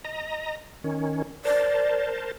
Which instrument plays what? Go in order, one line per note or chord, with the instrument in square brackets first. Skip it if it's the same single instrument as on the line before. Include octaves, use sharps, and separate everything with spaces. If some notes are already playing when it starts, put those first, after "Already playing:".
[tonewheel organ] D#5 A#5
D#3 C#4
[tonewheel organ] A#4 C5 A5 [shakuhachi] D5